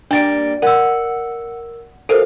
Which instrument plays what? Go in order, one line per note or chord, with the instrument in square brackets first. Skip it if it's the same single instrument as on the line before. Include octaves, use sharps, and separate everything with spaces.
[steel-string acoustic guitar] G3 A#3 G5 [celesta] D4 A6 D7
[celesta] A#4 E6 [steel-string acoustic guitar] F#5
[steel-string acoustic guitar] F#2 F5 [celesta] A4 A#4 C5